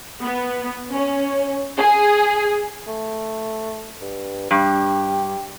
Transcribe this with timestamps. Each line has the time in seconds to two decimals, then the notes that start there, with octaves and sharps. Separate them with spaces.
0.21 B3
0.91 C#4
1.78 G#4
2.87 A3
4.01 G2
4.51 G2 G4